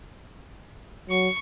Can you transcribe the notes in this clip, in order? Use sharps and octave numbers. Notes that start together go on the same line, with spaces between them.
F#3 C#6